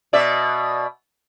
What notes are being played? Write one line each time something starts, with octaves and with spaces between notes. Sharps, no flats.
B2 D5 E5